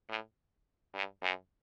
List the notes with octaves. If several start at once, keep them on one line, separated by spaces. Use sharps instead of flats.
A2
G2
F#2